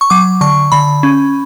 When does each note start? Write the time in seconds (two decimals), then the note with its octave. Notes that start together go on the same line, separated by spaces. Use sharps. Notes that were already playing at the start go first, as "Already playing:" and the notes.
0.01 C#6
0.10 F#3 D6
0.41 D3 C#6
0.72 D3 B5
1.03 C#4